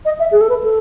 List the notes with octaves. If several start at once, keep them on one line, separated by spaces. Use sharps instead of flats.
D#5
E5
G#4
A4
B4
A4